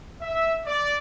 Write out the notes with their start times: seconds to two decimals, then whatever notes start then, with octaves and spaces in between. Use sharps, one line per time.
0.22 E5
0.66 D5